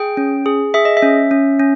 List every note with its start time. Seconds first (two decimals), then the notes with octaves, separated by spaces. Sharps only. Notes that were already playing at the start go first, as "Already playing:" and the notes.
Already playing: G#4 G5
0.17 C#4
0.46 G#4
0.74 G#4 E5
0.85 D#5
0.97 E5
1.02 C#4
1.31 C#4
1.60 C#4